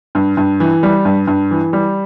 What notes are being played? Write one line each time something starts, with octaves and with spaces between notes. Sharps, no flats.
G2
G2
E3
G3
G2
G2
E3
G3